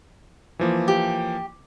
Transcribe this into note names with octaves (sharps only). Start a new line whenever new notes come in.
E3 F3 A#3
G4